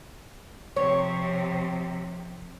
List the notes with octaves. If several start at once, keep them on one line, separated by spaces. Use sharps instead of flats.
C3 F3 C#5